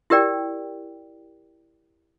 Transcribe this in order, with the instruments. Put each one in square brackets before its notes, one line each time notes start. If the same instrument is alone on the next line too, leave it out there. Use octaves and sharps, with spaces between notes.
[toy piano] E4 G4 A#4 D5 G5